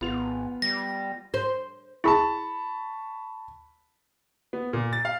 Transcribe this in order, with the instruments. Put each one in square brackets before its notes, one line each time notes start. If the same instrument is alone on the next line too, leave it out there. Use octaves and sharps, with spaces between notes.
[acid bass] G#1 [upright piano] B3 F4 F7
[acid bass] G3 [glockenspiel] A#6
[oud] C5
[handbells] E4 G#4 [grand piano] A5 B5 C#6
[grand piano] B3
A#2
A6
F5